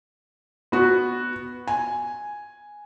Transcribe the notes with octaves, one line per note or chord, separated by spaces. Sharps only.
B3 F#4
G#5